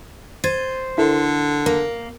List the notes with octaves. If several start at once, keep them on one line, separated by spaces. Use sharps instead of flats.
C5 G#6 A6 D#7
D3 E4 A4 A#4
A#3 A#4